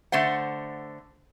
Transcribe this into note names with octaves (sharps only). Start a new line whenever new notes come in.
D3 A3 C5 F#5